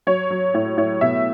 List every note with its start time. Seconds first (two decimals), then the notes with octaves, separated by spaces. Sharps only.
0.07 F#3 C#5
0.30 F#3
0.54 A2 C#5
0.77 A2 C#5
1.01 B2 E5